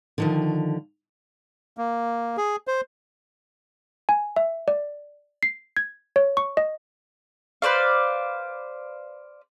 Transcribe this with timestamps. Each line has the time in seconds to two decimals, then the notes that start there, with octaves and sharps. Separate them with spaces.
0.18 D3 D#3 F3
1.78 A#3
2.37 G#4
2.68 C5
4.09 G#5
4.36 E5
4.68 D5
5.43 C7
5.77 G#6
6.16 C#5
6.37 C#6
6.57 D#5
7.62 B4 C5 D5 F5